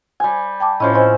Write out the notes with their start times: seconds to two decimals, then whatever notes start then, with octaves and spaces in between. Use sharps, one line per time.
0.20 G3 G#5
0.60 G5 A5 D6
0.80 A2 F3 C#4 E4 D#5 B5
0.94 C4 D#5 G#5 B5